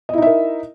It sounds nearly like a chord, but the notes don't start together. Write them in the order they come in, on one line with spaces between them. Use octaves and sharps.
D#5 E4 D#4 E5 A#4